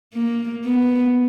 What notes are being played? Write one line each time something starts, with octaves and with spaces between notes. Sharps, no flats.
A#3
B3